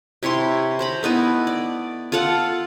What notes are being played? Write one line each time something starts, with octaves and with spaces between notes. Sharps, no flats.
C3 E4 C#5 C6
C5 A#5 B5
A3 B3 D#4 E4
D5
F4 A4 F5 F#5